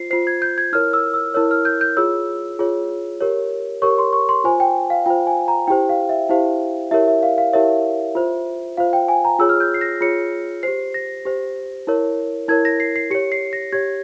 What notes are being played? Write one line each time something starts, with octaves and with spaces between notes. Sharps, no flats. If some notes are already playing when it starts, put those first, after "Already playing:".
Already playing: F4 C5 C7
F4 C5 C7
G#6
G6
G#6
E4 A#4 C#5 F6
E6
E6
E4 A#4 C#5 E6
F6
G6
G6
F4 G#4 C#5 E6
F4 G#4 C#5
G4 A#4 C#5
G4 A#4 C#5 C#6
C6
C#6
C6
F4 C5 G#5
G5
F5
F4 C5 G5
G#5
A#5
E4 G4 C5 G5
F5
E5
E4 G4 C5 F5
E4 G4 A#4 C#5 E5
E5
F5
F5
E4 G4 A#4 C#5 E5
F4 C5
F4 C5 F5
G5
G#5
A#5
F4 G#4 C#5 E6
F6
G6
C7
A#6
F4 G#4 C#5 C#7
G4 C5 C7
A#6
G4 C5
E4 A#4 C#5
E4 A#4 C#5 G#6
A#6
C7
C7
G4 C#5 C#7
C7
A#6
G4 C#5 G#6